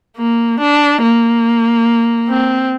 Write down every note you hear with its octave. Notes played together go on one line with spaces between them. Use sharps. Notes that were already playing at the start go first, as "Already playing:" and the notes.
A#3
D4
A#3
C4